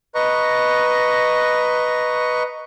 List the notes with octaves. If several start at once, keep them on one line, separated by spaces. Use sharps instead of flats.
B4 D#5 A#5 C#6